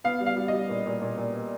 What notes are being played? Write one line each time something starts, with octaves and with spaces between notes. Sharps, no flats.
B3 F5
G3
F5
G3
D#5
G3
A#2
A#2
A#2
A#2